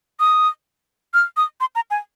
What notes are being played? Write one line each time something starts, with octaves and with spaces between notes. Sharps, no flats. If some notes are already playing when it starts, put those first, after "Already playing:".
D#6
F6
D#6
C6
A#5
G#5